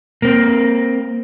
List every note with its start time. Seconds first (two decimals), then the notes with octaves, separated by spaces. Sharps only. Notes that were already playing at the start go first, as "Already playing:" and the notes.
0.22 A#3 C4